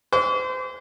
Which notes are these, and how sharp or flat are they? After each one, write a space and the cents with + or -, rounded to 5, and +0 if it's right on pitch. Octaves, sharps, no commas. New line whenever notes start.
C5 -35 D6 -45